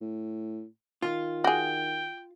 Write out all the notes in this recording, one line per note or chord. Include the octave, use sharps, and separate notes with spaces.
A2
D#3 F4
F#4 G#4 G5